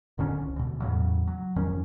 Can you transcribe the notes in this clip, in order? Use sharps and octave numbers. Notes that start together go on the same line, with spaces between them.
D1 D3 D#3 C#4
C2
D2 B2
E2 A2 C#3 F#3
F#3
F2 D#3 C#4